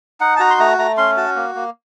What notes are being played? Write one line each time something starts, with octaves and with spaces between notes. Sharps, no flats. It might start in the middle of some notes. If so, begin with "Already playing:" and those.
D#4 F#5
A5
F#4 A#5
C6
A3 A#5
A3 A#5
C#4 C6
F#4 A5
A#3
A#3